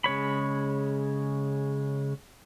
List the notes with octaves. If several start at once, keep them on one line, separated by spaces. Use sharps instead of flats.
C#3 G#3 C#5 B5